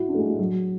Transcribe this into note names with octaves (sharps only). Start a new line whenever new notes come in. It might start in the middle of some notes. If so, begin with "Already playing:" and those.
Already playing: E4 F#4
D4
A3
G#3
G#3
F#3